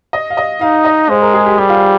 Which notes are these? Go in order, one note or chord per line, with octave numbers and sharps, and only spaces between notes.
D#5
F5
D#5
D#4 F5
D#5
G#3 C5
A#4
G#4
G4
G3 G4
F4
G4